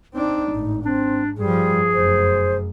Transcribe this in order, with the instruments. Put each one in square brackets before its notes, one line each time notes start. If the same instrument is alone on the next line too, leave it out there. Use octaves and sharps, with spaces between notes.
[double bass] C4 D4 [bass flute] D#4
[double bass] G#1 A2
[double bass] G#2 [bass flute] C4 [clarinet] D4
[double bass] G2 F3 [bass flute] G3 [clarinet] G#4
[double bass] F1 F#2 [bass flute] C5